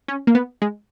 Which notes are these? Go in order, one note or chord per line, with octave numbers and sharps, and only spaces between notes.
C#4
A#3
B3
G#3